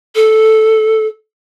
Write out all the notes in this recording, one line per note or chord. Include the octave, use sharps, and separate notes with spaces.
A4